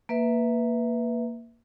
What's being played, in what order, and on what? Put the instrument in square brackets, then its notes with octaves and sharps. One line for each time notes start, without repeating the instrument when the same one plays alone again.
[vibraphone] A#3 B4 E5